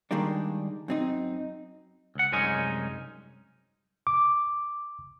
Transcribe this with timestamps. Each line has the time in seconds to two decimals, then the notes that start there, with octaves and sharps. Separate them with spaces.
0.11 D#3 G3 G#3 A#3 D4
0.88 F#2 C4 D#4
2.15 C#2 F#5
2.32 C2 F#2 G#3 C#4 D#4 G#5
4.07 D6